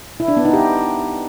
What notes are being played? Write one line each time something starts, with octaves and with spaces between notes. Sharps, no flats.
E4
D4
B3
D#4
G4